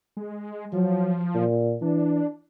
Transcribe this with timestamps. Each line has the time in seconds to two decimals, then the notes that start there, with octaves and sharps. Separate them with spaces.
0.17 G#3
0.73 F3 F#3
1.34 A#2
1.82 E3 D4